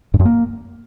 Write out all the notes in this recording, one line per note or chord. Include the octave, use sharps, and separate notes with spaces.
G2
F#2
A#3